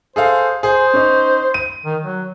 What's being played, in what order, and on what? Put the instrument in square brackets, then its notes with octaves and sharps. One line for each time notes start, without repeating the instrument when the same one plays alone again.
[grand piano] G#4 A4 F5 [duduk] C5
[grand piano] G#4 [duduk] C5
[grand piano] C#4 D#4
D#7
[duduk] D#3
F#3